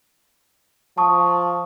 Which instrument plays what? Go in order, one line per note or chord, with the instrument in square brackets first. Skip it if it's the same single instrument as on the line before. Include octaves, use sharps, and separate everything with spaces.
[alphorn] F3 [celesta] A5 C#6 D#6